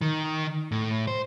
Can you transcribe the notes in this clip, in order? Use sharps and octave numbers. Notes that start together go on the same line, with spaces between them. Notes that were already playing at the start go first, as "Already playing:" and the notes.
D#3
A2
C5